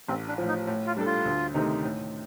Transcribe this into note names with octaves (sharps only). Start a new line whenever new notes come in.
A1 C4
D4
A2 F3
D#4
A2
F4
G3 D4 A4
F4
D2
C3 D#3 A3 D#4
A2